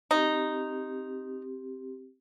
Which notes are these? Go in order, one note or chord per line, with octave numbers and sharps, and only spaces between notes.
C4 D#4 G4